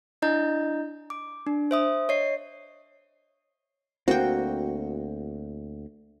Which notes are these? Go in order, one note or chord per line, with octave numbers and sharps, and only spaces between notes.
D4 E4 D#5 A#5 G6
D6
D4
C5 E5 D#6
C#5 D#5 C7
D2 A#3 C4 F#4 G5